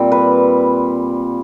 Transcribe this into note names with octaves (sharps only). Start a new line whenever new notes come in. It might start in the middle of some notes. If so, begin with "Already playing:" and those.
Already playing: A#2 G3 C4
B4